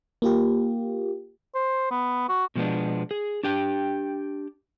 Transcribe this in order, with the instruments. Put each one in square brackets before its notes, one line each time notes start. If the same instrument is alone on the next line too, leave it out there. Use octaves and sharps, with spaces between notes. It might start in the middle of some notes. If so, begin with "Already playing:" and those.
[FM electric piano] A#3 F4 G4
[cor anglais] C5
B3
F#4
[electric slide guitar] B2 F3 G#3 B3 D4
G#4
D4 G4 G5